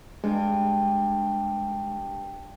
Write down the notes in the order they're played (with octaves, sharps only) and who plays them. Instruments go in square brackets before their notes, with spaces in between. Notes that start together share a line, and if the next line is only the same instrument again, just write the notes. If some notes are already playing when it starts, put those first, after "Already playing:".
[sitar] G2 [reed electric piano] G#3